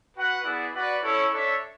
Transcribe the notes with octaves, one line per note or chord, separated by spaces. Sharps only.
F#4 B4 F#5
B3 E4 G#4 D5 F#5
F#4 B4 D5 F#5
C#4 E4 A4 C#5
D4 A4 C#5 E5